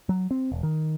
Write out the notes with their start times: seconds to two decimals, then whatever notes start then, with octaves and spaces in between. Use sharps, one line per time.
0.09 F#3
0.31 C4
0.52 E1
0.63 D#3